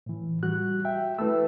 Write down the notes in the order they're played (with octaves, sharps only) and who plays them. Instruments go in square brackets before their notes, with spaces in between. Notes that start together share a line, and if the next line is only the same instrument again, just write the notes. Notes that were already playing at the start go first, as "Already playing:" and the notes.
[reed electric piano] A2 E3
G3 F#4 F#6
E5 G5
[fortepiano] E3 A3 [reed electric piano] E6